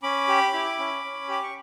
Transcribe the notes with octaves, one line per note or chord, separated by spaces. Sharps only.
C#4 B5 D6
G4
E4
C#4
C#4
G4 D6
C#6